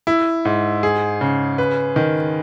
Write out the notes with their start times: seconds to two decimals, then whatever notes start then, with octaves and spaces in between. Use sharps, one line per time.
0.07 E4
0.45 G#2
0.83 G#4
1.21 C#3
1.58 B4
1.96 D#3